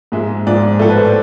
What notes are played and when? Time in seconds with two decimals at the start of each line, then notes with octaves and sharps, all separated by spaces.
0.12 G#2 F3 G#3 E5
0.47 G#2 F3 G#3 D5
0.79 A2 F3 A3 A4
0.89 B4
0.97 C5
1.05 D5